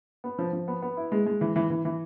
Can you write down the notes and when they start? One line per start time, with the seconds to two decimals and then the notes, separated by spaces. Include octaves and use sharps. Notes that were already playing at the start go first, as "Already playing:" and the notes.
0.24 B3
0.39 F3
0.53 F3
0.68 B3
0.82 B3
0.97 E4
1.12 G#3
1.26 G#3
1.41 E3
1.56 E3
1.70 E3
1.85 E3